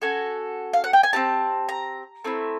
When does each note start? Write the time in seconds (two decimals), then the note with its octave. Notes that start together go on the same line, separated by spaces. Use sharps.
0.02 C#4 F#4 A4 G#5
0.73 F5
0.84 F#5
0.93 G5
1.03 G#5
1.13 C4 D#4 G4 A5
1.69 A#5
2.24 A3 C4 E4